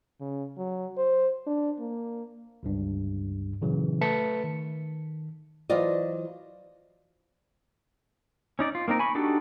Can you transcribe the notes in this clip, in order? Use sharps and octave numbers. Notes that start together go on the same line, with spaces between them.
C#3
F#3
C5
D4
A#3
G1 C#2 G2
A#2 C#3 E3 F#3
A3 B4 A5 B6 C#7
D#3
E3 F#3 F4 C5 D5 D#5
C#4 D#4 D5
F4
A#3 C4 D#4 A#4
G#5 B5 C#6
D4 D#4 F#4 G4 A4